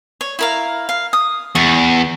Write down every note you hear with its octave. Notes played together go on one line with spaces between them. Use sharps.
C#5
E4 A#4 F5
F5
D#6
E2 C#6